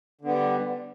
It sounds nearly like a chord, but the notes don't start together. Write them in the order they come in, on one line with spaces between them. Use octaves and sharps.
D3 B3 G3